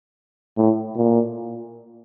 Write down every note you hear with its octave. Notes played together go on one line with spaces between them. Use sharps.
A2
A#2